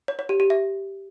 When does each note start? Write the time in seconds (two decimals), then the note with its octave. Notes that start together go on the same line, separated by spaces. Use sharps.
0.08 C#5
0.19 C#5
0.29 G4
0.40 G4
0.50 E5